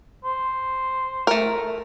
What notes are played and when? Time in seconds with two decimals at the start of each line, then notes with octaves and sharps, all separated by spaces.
0.24 C5
1.27 A3 A#4